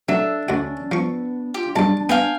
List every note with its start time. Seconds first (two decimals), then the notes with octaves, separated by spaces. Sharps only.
0.09 F#3 D4 A4 E5
0.49 D2 C#4 F#4
0.92 F3 B3 C#6
1.54 F4 G4
1.76 B1 G2 D4 A5
2.09 B3 F5 G5 G#5